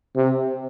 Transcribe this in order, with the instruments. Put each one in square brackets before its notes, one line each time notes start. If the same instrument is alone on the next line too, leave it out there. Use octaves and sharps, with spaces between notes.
[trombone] C3